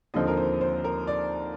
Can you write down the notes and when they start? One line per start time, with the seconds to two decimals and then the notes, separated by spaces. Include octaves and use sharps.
0.14 D#2 D3 F3 C4 D#5
0.27 A#4
0.37 C5
0.61 C5
0.84 A#4
1.07 D5